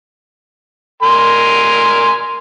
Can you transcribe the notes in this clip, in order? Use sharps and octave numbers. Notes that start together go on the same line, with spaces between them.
A#4 G#5 C6